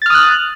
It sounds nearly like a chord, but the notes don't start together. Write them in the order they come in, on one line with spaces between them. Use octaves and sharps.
A6 F6 D#6 F#6